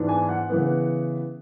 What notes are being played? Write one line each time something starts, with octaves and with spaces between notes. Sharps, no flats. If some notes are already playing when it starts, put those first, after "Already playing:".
Already playing: G#2 E3 B3 D4
G#5
F#5
C#3 E3 B3